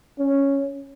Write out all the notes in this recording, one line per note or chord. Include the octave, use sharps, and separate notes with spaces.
C#4